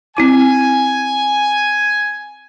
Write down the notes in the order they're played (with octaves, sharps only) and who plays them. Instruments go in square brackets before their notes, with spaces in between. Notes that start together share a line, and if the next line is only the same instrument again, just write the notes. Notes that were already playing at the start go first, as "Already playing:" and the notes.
[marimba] C4 E4 D6 [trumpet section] G#5